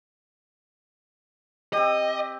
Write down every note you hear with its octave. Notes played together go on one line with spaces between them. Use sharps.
C4 G4 D#5